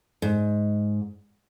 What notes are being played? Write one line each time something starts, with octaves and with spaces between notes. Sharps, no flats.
G#2